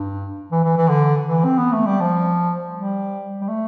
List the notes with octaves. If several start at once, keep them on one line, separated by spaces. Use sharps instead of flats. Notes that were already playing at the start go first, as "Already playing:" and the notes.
Already playing: G2
E3
E3
E3
D3
E3
C4
B3
A3
G3
F3
G3
G3
A3